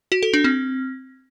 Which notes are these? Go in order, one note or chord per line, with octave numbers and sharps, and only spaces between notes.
F#4
A4
D4
C4